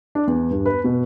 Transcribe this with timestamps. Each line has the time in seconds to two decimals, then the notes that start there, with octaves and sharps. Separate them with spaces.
0.15 D4
0.27 E2
0.51 G2
0.66 B4
0.84 B2